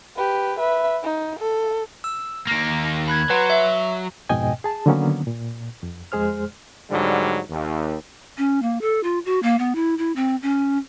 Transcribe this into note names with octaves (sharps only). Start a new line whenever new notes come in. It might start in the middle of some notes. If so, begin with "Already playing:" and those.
G4 B4
B4 E5
D#4
A4
E6
D#2 A#3 A#6 D7
B5 F#6 G#6
F#3 B4 F#5 C6
E5
F2 G#2 B2 D#5 G5 G#5
G#4 A5
D3 D#3 F#3 A#3 B3 C#4
A#2
F2
F2 G#3 G#4 C5 F6
G#2 D3 F#3 G3
D#2
C#4
A#3
A4
F4
F#4
A#3
B3
E4
E4
C4
C#4